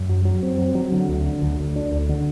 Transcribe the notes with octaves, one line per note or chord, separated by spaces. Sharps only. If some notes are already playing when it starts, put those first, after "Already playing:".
Already playing: F#2
F#3
F#3
C4
F#3
F#3
D3
D2
D3
D2
D2
D4
D2
D3